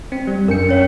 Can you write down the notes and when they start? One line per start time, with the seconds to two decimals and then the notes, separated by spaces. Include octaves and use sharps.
0.12 C4
0.27 G3
0.48 F#2 D4 A#4 C#7
0.69 C#4 C#5 F5